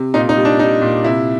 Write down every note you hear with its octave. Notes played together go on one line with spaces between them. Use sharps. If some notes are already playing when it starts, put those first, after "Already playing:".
Already playing: C3
A#2 D#4
D#4
G3
D4
G3 D#4
A#2
C3 E4